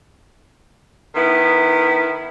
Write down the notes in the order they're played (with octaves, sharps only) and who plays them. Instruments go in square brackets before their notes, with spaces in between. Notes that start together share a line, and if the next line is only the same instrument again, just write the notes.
[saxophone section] D#3 B3 E4